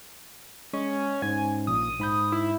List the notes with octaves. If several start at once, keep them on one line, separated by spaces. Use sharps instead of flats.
G#3 C#4
G#2 C#4 G#5
A#1 A#2 D#6
G#2 B5 G6
E4